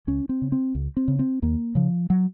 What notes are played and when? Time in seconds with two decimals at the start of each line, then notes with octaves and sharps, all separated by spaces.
0.07 C#2 C#4
0.29 C4
0.42 C#3
0.52 C4
0.75 C#2
0.97 C4
1.08 C#3
1.19 C4
1.42 D#2 A#3
1.75 C#3 F3
2.10 F#3